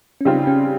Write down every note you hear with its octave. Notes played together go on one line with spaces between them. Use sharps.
C#4
C#3 G3 C4 D#4 F4
C#4